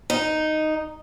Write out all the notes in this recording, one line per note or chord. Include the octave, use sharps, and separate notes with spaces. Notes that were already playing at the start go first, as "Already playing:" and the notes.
D#4